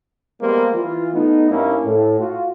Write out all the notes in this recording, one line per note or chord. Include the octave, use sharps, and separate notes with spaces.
G3 G#3 A#3 B3 C5
E3 F4
A3 B3 D#4
G2 A#3 C#4 D4 E4
A2
F4 F#4